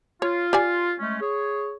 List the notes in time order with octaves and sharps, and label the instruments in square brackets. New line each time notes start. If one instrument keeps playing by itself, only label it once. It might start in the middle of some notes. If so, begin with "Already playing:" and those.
[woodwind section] F4 [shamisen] C#5
[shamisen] G4 D5 G#5
[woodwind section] G#3 A3 C#4
G#4 C#5